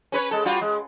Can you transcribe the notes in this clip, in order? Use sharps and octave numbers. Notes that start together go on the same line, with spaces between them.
C#4 B4 C#5
G#3 A4
G3 F4 F#4
G#3